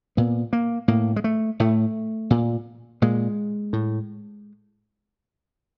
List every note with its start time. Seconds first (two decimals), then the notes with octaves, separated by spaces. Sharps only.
0.17 A#2 B3
0.53 A#3
0.88 A2 A#3
1.16 G#3
1.24 A3
1.60 A2 A3
2.30 A#2
3.02 A#2 G#3
3.73 A2